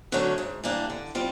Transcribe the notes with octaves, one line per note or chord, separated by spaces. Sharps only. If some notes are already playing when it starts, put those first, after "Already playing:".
D3 F#3 A3 C#4
G#2
E3 G3 A#3 D4
D3
G3 C4 F4